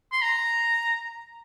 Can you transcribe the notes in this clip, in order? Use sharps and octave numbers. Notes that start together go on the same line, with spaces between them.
C6
A#5